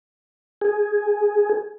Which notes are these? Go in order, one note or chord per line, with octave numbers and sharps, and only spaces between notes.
G#4